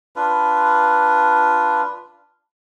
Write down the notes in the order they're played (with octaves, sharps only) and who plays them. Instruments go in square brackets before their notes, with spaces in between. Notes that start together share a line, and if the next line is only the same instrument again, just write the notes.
[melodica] D4 F4 B4